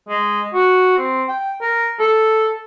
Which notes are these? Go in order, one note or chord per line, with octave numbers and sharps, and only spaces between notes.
G#3
F#4
C4
G5
A#4
A4